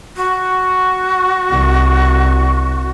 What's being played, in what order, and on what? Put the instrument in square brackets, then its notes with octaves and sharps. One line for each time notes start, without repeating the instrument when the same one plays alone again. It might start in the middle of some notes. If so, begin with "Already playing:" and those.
[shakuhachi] F#4
[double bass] C2